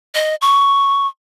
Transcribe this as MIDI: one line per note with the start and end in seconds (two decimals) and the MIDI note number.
0.15 0.35 75
0.42 1.07 85